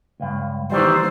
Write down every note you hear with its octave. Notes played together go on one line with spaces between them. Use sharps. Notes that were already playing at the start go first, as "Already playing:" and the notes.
C#2 G2
D#3 E3 G3 C5